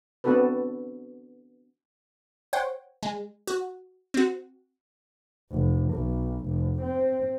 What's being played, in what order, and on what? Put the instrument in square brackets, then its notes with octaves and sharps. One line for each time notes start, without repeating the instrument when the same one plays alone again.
[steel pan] B3 C4 D4 F#4 A4 B4
[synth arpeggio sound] C5 C#5 F#5 G5
G#3
F#4
C4 F#4
[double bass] F1
B1
F1
C4